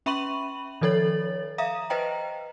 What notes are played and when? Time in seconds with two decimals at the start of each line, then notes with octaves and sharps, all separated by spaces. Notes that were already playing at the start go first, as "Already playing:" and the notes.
0.06 C#4 E5 B5 C#6 D#7 F#7
0.81 D#3 F3 A4 C#5 A6 F#7
1.58 E5 F5 A#5 D#6
1.90 B4 C5 D#5 G5 A#5